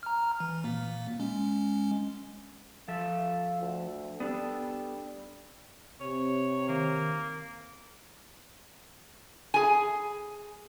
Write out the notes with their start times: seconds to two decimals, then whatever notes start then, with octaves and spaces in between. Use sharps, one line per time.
0.03 A#5 F6
0.40 E3
0.64 A#2 A#3
1.20 G#3 C#4
2.88 F3 F4 A4 E5
3.62 D2
4.20 G3 B3 D4 A4
6.01 C3 C#5
6.69 D#3 A#3
9.54 G#4 G#5